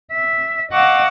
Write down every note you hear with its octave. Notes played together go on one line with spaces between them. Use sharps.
E5
D#5 F5 F#5 C#6 D6 E6